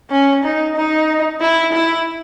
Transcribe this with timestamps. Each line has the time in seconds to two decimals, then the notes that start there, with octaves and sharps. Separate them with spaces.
0.10 C#4
0.44 D#4
0.76 D#4
1.41 E4
1.73 E4